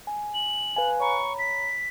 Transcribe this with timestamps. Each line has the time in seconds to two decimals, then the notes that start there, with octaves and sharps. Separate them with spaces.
0.07 G#5
0.34 F#7
0.76 B4 F5 G#5
1.00 C#5 A#5 B5 C#6
1.39 B6